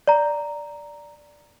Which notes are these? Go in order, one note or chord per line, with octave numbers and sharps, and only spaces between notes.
D5 A#5